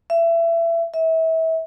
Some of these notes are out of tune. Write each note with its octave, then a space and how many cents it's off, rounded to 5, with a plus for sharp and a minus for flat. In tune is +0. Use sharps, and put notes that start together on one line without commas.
E5 +25
E5 -30